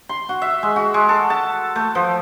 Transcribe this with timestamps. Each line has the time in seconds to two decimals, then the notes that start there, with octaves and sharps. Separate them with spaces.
0.09 C6
0.29 F#4
0.42 E5
0.63 G#3
0.76 F#4
0.94 G#3
1.09 A4
1.30 A5
1.75 A3
1.95 F3